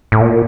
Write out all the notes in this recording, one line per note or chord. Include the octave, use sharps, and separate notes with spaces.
A2
A#2